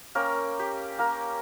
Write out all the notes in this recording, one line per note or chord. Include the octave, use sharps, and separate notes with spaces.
A#3 C#4 A#4 G5
G4
A#3 A#4